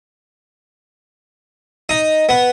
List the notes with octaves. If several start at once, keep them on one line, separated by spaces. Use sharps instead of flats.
D#4
B3